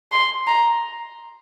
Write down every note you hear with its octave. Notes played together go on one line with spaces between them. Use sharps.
C6
A#5